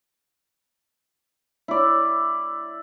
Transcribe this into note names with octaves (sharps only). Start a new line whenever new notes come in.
E4 D5